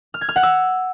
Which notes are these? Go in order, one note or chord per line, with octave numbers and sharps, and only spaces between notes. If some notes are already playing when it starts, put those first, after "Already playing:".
F6
G#6
F6
F#5
E6